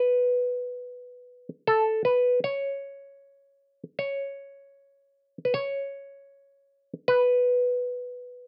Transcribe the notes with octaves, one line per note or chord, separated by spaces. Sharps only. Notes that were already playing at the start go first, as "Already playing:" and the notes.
Already playing: B4
A4
B4
C#5
C#5
B4
C#5
B4